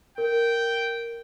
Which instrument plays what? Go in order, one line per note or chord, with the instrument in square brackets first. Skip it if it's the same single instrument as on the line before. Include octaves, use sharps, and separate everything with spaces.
[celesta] A#4 [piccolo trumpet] G5